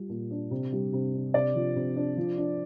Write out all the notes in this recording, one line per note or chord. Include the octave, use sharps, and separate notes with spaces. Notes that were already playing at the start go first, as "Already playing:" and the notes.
Already playing: G3 F4
A#2
D4
C3
G3
C3
D4
C3 D5
F3
C3
D4
F3
D4